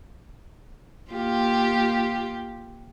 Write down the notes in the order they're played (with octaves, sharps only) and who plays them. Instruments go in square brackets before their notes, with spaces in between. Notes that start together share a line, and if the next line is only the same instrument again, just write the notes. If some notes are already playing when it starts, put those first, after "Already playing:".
[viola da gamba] A#3 F4 G4